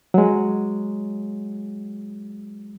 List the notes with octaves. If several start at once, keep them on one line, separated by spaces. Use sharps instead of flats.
F#3 G#3